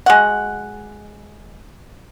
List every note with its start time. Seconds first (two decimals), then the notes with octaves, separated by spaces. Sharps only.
0.06 G#3 F#4 F#5